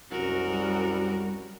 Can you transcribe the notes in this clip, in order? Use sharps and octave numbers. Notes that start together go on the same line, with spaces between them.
C2 F#2 F#4 A#4
G3